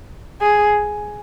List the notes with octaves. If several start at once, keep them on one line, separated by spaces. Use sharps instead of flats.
G#4